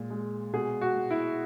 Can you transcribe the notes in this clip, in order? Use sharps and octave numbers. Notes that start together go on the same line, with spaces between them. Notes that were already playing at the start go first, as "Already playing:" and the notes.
Already playing: A#2 G#3
G#3
B2 G#4
F#4
B2
E4